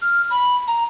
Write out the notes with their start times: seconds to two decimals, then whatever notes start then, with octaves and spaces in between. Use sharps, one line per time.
0.02 F6
0.31 B5
0.68 A#5